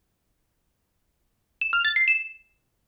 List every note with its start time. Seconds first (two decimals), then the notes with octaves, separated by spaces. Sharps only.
1.61 E7
1.73 F6
1.85 A6
1.96 C7
2.08 E7